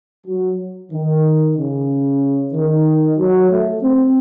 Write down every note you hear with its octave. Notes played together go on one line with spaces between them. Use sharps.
F#3
D#3
C#3
D#3
F#3
A3
C4